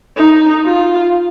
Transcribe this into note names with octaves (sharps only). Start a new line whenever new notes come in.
D#4
F4